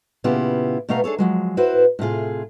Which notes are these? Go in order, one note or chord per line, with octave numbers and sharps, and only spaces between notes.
A#2 C#3 B3 E4 F4 G4
B2 A3 B3 F5 A#5
D4 G#4 A4 C#5
F3 F#3 G#3
E4 F#4 B4 C5
A2 C3 F4 G#4